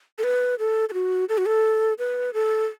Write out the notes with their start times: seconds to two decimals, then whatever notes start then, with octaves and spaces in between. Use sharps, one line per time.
0.18 A4
0.24 B4
0.59 A4
0.89 A4
0.93 F#4
1.29 A4
1.38 F#4
1.47 A4
1.99 B4
2.34 A4